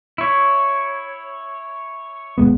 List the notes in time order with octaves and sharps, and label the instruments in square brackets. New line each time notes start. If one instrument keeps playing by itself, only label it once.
[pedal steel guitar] E4 C#5
[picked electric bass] D#1 G#3 B3